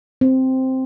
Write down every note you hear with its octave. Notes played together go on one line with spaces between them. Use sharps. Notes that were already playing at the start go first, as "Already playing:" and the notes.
C4